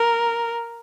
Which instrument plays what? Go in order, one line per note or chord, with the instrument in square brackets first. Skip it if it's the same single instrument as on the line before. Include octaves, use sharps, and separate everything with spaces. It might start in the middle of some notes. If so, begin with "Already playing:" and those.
Already playing: [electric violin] A#4